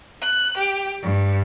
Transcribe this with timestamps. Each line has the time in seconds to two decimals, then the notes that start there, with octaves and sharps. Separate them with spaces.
0.22 F#6
0.56 G4
1.01 G2